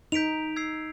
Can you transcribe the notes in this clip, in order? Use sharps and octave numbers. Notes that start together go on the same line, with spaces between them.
D#4 G6 B6 D7 F7
E6 G#6 C7